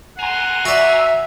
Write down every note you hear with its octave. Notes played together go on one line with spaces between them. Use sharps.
F#5 G#5 A#5 C6
F#4 D5 E5